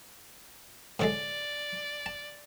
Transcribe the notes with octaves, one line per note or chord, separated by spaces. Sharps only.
A2 D3 G#3 D5
A5